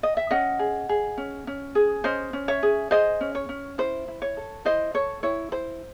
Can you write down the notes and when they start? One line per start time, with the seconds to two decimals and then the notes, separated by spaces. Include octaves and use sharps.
0.03 D#5
0.17 E5
0.31 C#4 D#5 F#5
0.59 G#4
0.89 G#4
1.17 C#4
1.47 C#4
1.75 G#4
2.04 C#4 C5 D#5
2.33 C#4
2.48 C#5 E5
2.63 G#4
2.91 G#4 C5 D#5
3.21 C#4
3.35 C#5
3.49 C#4
3.78 E4 C5
4.08 E4
4.22 C#5
4.37 A4
4.65 E4 C5 D#5
4.94 A4 C#5
5.23 E4 C#5
5.52 E4 C5